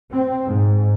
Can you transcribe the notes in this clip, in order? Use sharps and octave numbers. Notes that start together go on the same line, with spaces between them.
C4
G#2